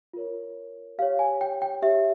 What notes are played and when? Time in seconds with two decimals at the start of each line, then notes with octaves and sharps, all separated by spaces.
0.13 F4 A#4 C#5
0.98 G4 F5
1.02 C#5
1.19 G#5
1.41 G5
1.62 G5
1.82 G4 C#5 E5